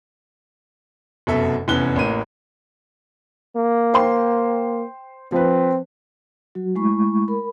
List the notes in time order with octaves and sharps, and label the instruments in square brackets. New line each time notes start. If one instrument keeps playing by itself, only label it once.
[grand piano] F1 F#2 B2 A4 E5
F1 E2 E3 C#4 F#6 G7
A1 A2 A#3 D#7
[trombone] A#3
[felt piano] C5 G5 C6
[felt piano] F3 B4 [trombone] C4
[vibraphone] F#3 F#4
G#3 A3 E4 B5 C#6
A#4 B5